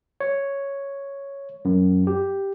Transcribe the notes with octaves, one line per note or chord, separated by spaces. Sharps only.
C#5
F#2
G4